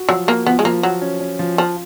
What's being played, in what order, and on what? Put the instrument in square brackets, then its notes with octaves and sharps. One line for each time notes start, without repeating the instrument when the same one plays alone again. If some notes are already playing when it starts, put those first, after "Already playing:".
Already playing: [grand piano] F#4
[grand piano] F3 [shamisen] F#3
[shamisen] A#3 [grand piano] F#4
[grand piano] F3 [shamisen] B3
[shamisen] G#3
[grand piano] F3 [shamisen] A#3
[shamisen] F#3 [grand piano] F#4
[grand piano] C#4
C#4
F3
[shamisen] F3 [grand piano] F4